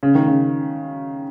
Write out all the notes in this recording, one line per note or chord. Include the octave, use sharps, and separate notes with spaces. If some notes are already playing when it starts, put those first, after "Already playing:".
C#3
D#3
C#3